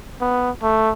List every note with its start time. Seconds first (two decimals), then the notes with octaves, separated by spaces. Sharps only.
0.21 B3
0.63 A3